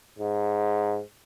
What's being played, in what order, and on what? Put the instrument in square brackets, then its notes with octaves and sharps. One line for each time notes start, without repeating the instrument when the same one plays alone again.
[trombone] G#2